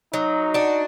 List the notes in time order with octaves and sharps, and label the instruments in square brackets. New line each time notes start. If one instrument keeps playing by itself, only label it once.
[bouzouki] F#3 [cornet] D#4
[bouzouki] D4 F#4